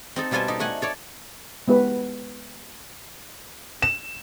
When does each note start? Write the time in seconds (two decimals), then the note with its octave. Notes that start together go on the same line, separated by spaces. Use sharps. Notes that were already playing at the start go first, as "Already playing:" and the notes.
0.16 C4 D#4 A4
0.31 B2 G3 F4 A4 C5 G#5
0.48 D#4 G4
0.60 A3 F#5 G#5
0.82 A4 C#5 D5
1.68 G#3 B3 G4 B4
3.82 E7